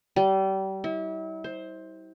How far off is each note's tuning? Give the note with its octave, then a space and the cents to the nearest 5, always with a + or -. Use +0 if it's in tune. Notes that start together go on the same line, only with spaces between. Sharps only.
G3 -30
E4 -35
C5 +10